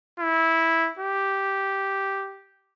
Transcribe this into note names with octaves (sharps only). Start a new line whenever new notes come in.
E4
G4